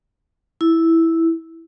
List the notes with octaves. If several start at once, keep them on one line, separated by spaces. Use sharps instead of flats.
E4